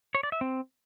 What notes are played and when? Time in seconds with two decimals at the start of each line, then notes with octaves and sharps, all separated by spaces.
0.15 C#5
0.23 D5
0.32 E5
0.41 C4